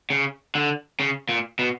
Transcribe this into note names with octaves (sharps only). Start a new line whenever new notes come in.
C#3
D3
C#3
A#2
B2